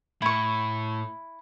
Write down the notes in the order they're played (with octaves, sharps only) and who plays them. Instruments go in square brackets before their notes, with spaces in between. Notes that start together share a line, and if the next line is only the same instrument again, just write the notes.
[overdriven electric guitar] A2 [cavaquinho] E4 C#6